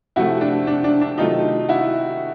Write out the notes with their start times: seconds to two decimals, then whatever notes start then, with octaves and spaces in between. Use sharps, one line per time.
0.16 C3 F3 A3 E4 F#4
0.41 D4
0.67 D4
0.84 D4
1.01 D4
1.18 C3 D#3 F#3 A3 D#4 F4
1.69 E4 F#4